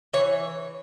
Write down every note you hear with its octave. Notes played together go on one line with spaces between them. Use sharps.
E3 C#5